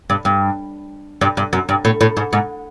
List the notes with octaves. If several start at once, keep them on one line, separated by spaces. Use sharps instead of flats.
G2
G2
G2
G2
F#2
G2
A2
A2
G#2
G#2